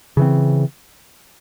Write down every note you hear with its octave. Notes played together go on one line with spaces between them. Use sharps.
C#3 E3 C4